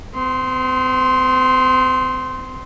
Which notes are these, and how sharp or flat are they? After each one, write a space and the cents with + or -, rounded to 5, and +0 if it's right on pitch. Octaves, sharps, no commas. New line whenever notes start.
C4 -40 C6 +0